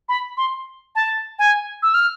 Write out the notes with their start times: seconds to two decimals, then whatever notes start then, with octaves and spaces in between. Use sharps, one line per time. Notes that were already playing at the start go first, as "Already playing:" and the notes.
0.09 B5
0.37 C6
0.95 A5
1.39 G#5
1.83 E6
1.94 F6